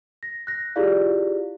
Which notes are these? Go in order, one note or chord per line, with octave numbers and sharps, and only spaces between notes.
A#6
F#6 A#6
E4 F4 G4 G#4 D5 F5